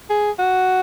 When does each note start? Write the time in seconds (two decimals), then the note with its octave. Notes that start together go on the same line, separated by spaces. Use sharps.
0.10 G#4
0.39 F#4